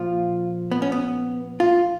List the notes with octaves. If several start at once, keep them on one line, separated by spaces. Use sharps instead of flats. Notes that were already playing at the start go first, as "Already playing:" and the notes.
Already playing: A#2 F3 F4
B3
C#4
B3
F4